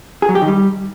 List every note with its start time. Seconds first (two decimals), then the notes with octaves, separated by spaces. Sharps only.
0.22 G#4
0.29 F#3
0.35 G4
0.42 D#3
0.48 G3